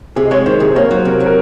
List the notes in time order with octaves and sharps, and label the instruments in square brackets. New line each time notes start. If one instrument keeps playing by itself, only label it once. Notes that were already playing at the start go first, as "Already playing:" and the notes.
[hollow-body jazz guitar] C3 [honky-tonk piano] G#4
[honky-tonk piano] D#5
[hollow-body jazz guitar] G#3 [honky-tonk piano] C#5
[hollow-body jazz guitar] D#3 [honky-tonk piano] C5
[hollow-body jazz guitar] C3 [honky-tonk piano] G#4
[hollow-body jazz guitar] A#3 [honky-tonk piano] C#5
[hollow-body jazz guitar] F#3 [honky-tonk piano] C5
[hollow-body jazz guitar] C3 [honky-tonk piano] A#4
[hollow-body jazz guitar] F#3
[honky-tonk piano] A#4